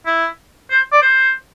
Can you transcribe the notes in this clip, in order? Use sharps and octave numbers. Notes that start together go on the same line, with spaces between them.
E4
C5
D5
C5